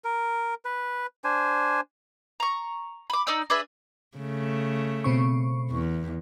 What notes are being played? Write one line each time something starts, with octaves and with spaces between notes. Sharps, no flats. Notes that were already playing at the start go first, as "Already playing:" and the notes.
A#4
B4
D4 C5 G#5
A#5 C#6
B5 D6
D#4 D5 E6
D4 G#4 B4 E5
C#3 A3
B2 C4 C#6
E2